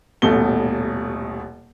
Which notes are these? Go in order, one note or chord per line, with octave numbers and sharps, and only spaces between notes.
D#1 A1 B2 A3 G7